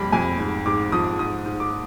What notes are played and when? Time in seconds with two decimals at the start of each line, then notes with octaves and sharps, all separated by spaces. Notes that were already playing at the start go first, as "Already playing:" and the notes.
Already playing: F2 G3 B5
0.12 F2 G#5
0.39 G#2
0.66 G#2 D6
0.92 F3 D#6
1.19 G#2 D#6
1.46 G#2
1.60 D6